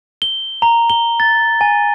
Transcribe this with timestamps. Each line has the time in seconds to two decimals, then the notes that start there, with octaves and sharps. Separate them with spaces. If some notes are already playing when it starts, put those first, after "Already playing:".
0.22 G7
0.62 A#5
0.90 G7
1.20 A6
1.61 G#5